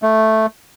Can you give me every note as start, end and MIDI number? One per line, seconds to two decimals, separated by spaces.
0.03 0.46 57